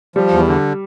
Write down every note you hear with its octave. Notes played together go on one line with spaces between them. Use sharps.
F3 G3
E2
D3